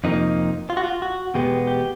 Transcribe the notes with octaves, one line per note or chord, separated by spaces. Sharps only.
F2 C3 F3 A#3 D#4
F4
F#4
F4
F#4
E2 B2 G#3 B3 G4
G4